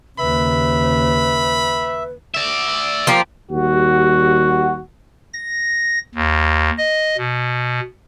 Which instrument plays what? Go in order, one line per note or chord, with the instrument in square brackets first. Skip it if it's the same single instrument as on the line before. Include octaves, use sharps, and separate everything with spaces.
[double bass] D#2 C#3 [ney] B4 [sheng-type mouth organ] E5 [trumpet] B5
[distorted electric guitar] D5 E5
[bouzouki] F3 A#3 G4
[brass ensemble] D#2 G3 F#4
[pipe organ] A#6
D#2
D#5
B2